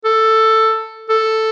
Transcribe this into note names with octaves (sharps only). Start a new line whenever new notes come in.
A4
A4